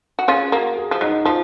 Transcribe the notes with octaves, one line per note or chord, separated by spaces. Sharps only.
F#4
C#4 F4 G#4
A#3 F#4
G#4
F3
F#3 D#4 D#5
F3 F4 F5